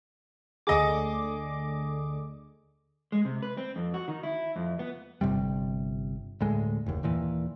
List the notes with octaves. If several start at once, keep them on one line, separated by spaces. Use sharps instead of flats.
D2 D3 G#4 D#5 D6
G#3
C3
B4
C4
F2
F#4
D#3
E4
F2
B3
G1 C3 G3
D2 A2 G#3
F#1 D#2
D#2 A#2 E3